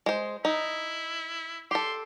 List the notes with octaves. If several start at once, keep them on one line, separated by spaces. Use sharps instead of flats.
G#3 C5
D#4 E4
G4 A4 C6